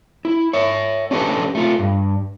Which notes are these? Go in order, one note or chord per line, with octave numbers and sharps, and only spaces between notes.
E4
C#5 E5
C#4 D4 G4 A4 B4
A3 F4
G2